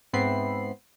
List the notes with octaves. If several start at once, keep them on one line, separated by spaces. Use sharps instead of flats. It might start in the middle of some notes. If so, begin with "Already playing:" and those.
G#2 B3 C4 E5 B5 C7